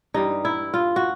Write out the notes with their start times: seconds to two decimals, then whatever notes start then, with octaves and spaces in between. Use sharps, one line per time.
0.14 G2 E3 G3 D#4
0.45 E4
0.74 F4
0.96 F#4